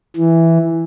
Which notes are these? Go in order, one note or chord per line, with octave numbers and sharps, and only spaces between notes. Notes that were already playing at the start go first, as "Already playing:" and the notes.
E3